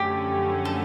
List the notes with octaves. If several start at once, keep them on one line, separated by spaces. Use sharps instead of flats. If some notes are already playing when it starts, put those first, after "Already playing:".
Already playing: F#2 D3 F3 A3 C#4 G4
A4